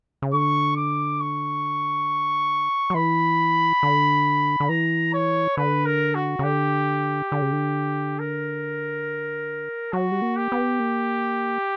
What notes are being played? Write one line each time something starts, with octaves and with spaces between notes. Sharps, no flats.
C#3
D3 C#6
D6
C#6
F#3
E3 B5
D3
D3
E3 A#5
C#5
D3 B4
A#4
F#4
C#3
D3 G4
D3
C#3
D3
A#4
F#3 F#4
G3
A#3
G4
B3
A#3